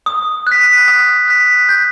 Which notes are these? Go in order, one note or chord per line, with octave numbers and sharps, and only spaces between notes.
D#6
F#6 B6
D#6
F#6 B6
G6